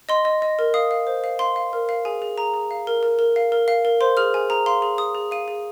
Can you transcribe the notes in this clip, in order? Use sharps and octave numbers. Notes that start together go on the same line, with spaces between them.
D#5 C6
D#5
D#5
A#4
F5 D#6
F5
C5
F5
F5 C6
F5
A#4
F5
G#4 G#5
G#4
G#4 A#5
G#4
F5
A#4
A#4
A#4
F5
A#4
F5
A#4
C5 C6
G#4 F6
G#4 G#5
G#4 A#5
F5 C6
G#4
G#4 D#6
G#4
F5 D#7
G#4